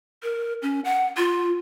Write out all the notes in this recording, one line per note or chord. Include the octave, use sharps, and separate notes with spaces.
A#4
C#4
F#5
F4